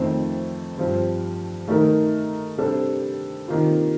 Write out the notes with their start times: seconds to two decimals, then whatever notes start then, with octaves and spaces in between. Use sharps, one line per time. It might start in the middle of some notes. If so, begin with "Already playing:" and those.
Already playing: F2 D#3 A3 C4
0.78 G2 F3 C4
1.68 D#3 A3 D#4 A#4
2.58 C3 G3 D4 A4 C5
3.48 C3 D#3 A#3 F4